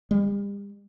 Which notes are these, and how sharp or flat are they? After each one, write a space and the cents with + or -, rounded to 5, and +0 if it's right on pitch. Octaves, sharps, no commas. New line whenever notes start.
G3 +40